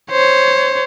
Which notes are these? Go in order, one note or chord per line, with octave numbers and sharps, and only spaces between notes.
C5 C#5